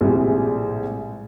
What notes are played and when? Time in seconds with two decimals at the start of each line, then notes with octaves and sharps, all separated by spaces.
0.01 A#1 A2 C3 G3 G#3